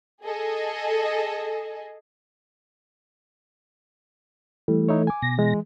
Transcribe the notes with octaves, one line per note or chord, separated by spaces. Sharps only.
G#4 A4 D#5
E3 G3 A3
D#4 E4 C#5
G#5 D6
B2 A#6
E3 G#3